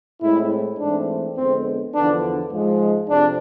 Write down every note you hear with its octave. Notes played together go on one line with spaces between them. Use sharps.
A2 G#3 C4 E4
G#2 E3 A3 C4 D4
F2 D3 G#3 B3 C4
E2 D3 F3 B3 D4
G#2 F3 G#3
F2 C3 D4